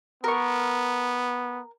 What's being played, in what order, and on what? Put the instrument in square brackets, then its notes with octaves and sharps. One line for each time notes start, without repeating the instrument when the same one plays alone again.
[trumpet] B3 [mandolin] A#4 C#6